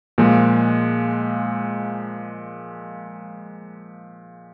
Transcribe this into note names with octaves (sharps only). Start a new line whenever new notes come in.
A#2 F3 G#3